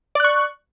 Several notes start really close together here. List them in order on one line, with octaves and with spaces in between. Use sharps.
D5 F#6 C#6